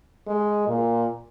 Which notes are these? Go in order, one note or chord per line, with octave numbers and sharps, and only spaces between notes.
G#3
A#2